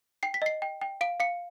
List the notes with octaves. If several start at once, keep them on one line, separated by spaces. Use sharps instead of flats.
G5 C7
B6
D#5 C7
G5
G5
F5 D7
F5 C#7